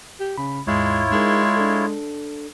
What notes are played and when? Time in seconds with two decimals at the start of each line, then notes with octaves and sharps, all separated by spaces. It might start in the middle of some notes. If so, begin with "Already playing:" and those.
0.20 G4
0.38 C#3 B5
0.67 D#2 G#2 G#3 E4 F4 C#5
1.11 G#3 D#4 G#4 A#4
1.56 D4 A4